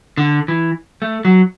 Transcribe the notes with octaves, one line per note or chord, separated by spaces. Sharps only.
D3
E3
A3
F#3